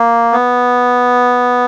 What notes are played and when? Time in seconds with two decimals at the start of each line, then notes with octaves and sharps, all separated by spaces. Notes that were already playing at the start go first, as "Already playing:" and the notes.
Already playing: A#3
0.32 B3